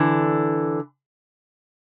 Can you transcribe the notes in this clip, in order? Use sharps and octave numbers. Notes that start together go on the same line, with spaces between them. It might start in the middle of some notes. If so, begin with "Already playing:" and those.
Already playing: D3 E3